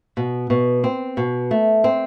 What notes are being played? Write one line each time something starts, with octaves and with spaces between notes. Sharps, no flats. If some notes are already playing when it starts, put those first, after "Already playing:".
B2
B2
C4
B2
A3
C4